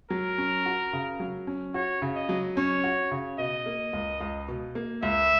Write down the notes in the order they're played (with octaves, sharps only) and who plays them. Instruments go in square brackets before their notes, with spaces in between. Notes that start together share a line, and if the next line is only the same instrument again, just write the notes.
[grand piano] F#3 [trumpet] A#4
[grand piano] C#4
F#4
C#3
F#3
C#4
[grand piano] F#4 [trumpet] C#5
[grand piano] C#3
[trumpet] D#5
[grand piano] F#3
[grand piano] C#4 [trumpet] C#5
[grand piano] F#4
C#3
[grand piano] B2 [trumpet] D#5
[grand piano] A#3
C#2
C#2
B2
A#3
[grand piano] C#2 [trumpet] E5